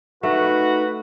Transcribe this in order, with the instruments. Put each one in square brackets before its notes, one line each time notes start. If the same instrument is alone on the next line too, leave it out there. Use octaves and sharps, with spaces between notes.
[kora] A3 [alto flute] D#4 [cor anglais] F#4 [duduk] B4